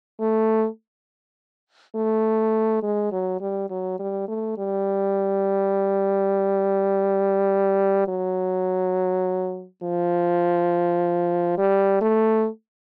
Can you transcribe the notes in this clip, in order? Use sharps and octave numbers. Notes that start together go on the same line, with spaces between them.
A3
A3
G#3
F#3
G3
F#3
G3
A3
G3
F#3
F3
G3
A3